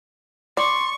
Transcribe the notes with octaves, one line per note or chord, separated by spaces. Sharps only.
D5 C6 C#6